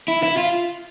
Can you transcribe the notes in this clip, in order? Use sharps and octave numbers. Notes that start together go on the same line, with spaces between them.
E4
E4
F4